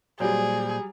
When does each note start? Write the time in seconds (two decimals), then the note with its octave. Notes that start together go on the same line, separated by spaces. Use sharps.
0.20 A#2 F#3 G3 G#4 C5 D5